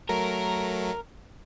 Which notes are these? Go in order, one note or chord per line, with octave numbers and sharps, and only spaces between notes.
F#3 A3 A#4